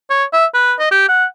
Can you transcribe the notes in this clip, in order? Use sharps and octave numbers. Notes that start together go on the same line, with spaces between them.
C#5
E5
B4
D#5
G4
F#5